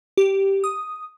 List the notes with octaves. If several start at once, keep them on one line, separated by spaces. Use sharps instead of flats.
G4
D#6